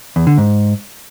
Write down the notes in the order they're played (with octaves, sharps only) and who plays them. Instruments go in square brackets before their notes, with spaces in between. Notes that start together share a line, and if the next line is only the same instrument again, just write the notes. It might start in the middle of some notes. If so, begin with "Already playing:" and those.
[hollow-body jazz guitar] E2
D3
G#2